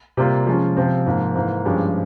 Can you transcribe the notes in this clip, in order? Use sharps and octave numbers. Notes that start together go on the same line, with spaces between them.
C3 G3 A#3 F4
F3 G#3 C#4 F4
C3 F3 C4
G#2 F3 A#3
G#2 E3 A#3
G2 F3 G#3 C#4 G4